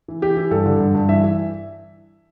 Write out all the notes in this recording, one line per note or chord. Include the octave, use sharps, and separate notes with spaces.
E3
E3 G4
E3
G2 A4
D3
G2
G2
E3 E5
E3